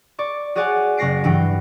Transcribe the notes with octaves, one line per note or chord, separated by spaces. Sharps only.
D5 C#6
F#4 G#4 C#5 D5 F#5 G#5
F#1 F#4 A#6 C7 D7
G2 E3 F#4 G5